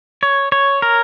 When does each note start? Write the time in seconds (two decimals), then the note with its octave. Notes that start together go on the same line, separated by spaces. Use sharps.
0.23 C#5
0.52 C#5
0.82 A#4